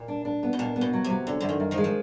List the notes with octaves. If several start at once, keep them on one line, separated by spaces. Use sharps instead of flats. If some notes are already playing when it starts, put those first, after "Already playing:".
Already playing: A#2
D4
D4
B3
B2
A#2 D4
B3
B2
F#3
C3
F#3
D3 C#4
F#2 D3
D#3
F#2
D#3 F3
G#3
F3